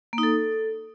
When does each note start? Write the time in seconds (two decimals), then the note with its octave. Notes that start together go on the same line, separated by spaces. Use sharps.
0.13 A#3
0.18 D#4
0.23 A4